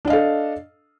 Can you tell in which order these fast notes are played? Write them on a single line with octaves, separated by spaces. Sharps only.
D4 D#5 F5 A4